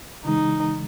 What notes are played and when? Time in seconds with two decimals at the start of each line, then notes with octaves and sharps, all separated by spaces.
0.25 C#3 E3 G#3 D#4